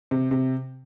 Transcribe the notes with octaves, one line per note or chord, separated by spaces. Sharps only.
C3
C3